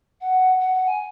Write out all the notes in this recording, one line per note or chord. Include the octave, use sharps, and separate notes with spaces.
F#5
F#5
F#5
G#5